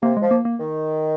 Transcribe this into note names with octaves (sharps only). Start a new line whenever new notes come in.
C3 A#3
G#3
F3
A#3
A#3
D#3